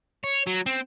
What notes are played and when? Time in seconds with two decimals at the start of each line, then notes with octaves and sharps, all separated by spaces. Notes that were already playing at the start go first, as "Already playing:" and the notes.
0.24 C#5
0.47 F#3
0.66 C4